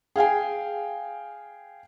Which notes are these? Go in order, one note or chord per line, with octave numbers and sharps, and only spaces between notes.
G#4 F5 G5 G#5